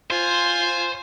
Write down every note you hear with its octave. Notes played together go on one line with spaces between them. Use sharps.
F4 C5 G#5